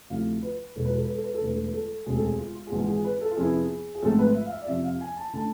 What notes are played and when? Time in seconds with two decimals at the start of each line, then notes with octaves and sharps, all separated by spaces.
0.10 D2 C3 F3 A3 E4 F5
0.43 B4
0.75 E1 E2 B2 A4
0.85 B4
0.95 A4
1.05 B4
1.14 A4
1.24 B4
1.34 A4
1.41 E1 E2 D3 A3 B4
1.54 A4
1.63 B4
1.73 A4
2.06 E1 D2 C3 G#3 C4 G#4
2.15 A4
2.23 G#4
2.38 F4
2.55 F4
2.67 G#4
2.71 G#1 G#2 E3 F4
2.88 G#4
3.04 B4
3.21 A4
3.31 F4
3.37 F2 C3 F3 B3 E4 G#4
3.95 G#4
4.02 G#1 G#2 F3 A3 C4 A4
4.19 B4
4.35 E5
4.46 F5
4.51 E5
4.62 D5
4.68 F2 C3 F3 E5
4.84 F5
5.01 G#5
5.17 A5
5.33 D3 A3 A5